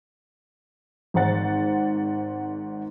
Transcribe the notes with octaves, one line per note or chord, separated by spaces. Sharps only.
G#1 G#2 D#3 C5 F#5 A6